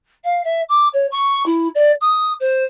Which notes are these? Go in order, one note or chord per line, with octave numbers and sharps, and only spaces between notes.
F5
E5
D6
C#5
C#6
E4
D5
D#6
C5